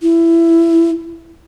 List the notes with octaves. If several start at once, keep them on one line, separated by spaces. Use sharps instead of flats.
E4